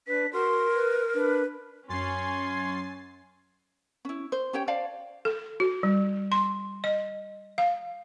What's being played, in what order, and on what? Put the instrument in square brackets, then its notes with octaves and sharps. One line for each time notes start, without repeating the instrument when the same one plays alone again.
[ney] D4 [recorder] B4 [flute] B6
[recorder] F#4 [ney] A#4 [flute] C6
[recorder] B4
[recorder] D4 [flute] B4
[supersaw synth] F#2 A6 C7 [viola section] C#4 [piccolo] G#5 [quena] C6
[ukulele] C#4 E4
C5
C#4 G4 C#5 G5
C5 D5 F5 A5
[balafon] A4
F#4
G3
C6
D#5
F5